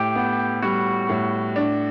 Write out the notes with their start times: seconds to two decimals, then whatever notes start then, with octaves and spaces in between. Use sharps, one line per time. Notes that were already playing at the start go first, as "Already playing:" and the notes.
Already playing: A2 G4
0.15 B3
0.63 G3 F#4
1.09 A2
1.56 D4